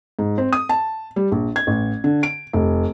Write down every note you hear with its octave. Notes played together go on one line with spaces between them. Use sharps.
G#2
C4
D#6
A5
G3
A#1
G#6
A1
D3
D7
F1